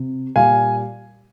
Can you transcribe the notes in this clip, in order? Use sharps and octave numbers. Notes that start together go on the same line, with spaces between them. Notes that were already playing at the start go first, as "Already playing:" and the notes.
Already playing: C3
A#2 G3 F5 G#5